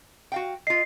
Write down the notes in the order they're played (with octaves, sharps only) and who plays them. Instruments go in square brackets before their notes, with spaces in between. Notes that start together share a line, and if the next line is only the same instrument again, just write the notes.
[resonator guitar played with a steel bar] F#4 F5 G5
[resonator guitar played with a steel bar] F4 D#5 [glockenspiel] C7